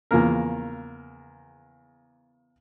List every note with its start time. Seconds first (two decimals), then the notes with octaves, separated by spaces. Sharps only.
0.11 E2 C#3 F3 A#3 A#4